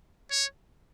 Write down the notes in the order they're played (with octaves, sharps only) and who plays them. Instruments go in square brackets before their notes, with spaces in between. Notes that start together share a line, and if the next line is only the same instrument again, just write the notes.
[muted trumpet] C#5